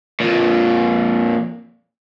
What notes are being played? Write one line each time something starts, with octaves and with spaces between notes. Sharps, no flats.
F2 A#2